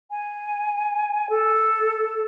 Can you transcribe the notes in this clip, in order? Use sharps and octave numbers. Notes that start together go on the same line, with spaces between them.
G#5
A4